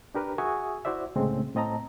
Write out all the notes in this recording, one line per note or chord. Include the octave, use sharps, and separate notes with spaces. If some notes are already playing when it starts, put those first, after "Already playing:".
D4 G4 A#4 B4
F#4 G#4 E5 G#5 C#6 D#6
E4 F#4 C5 D5 E5
C2 A2 C#3 G#3 A3 C4
A2 C4 D#5 A5 A#5